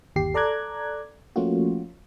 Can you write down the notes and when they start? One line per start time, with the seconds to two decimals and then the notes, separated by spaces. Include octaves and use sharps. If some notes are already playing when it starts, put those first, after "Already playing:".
0.16 G1 D#2 G4 C7
0.34 A4 D5 A#5 D6 F#6 G#6
1.36 F3 A3 A#3 C#4 F4 F#4